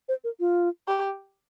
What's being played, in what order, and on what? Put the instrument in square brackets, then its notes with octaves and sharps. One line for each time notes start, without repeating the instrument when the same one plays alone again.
[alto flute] C5
A#4
F4
[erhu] G4